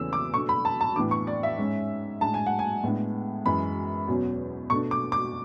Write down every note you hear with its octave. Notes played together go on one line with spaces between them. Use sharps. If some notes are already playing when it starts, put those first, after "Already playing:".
Already playing: E2 C#3 E3 A3 C#4 E6
D6
B2 A3 D4 C#6
B5
A5
A5
A2 E3 B3 D4 D6
C#6
D5
E5
G#2 G#3 C#4
A2 G#3 D4 A5
G#5
F#5
G#5
A2 G#3 B3 D4
F#2 E3 G#3 B5
E2 B2 F#3 C#4
B2 A3 D4 C#6
D6
D6